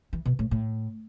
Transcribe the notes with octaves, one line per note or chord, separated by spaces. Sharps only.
E3
B2
A2
A2